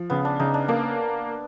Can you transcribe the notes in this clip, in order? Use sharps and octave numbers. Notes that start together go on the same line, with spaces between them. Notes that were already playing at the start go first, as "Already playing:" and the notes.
Already playing: F3
C#3 B3
D4
C#3 D#4
D4
A#3 D4